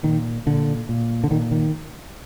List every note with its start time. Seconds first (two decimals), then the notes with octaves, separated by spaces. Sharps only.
0.03 A#2 D#3
0.46 A#2 D3
0.89 A#2
1.24 D3
1.30 A#2 D#3
1.51 D#3